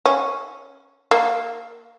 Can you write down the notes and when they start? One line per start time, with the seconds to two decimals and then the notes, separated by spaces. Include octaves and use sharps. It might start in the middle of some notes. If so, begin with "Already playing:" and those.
0.06 C#4
1.11 A#3